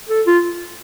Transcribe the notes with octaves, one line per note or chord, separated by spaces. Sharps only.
A4
F4